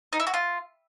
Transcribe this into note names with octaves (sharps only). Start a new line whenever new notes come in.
D#4
E4
F#4
F4